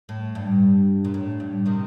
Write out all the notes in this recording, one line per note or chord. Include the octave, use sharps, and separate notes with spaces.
A2
G2
A#2
A2
G2
C3 D#3